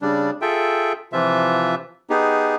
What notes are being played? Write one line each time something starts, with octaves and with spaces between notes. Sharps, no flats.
C#3 G3 D4
F4 G#4 A4 E5 G5
C3 E3 F3 F4 E5
B3 D#4 G4 G#4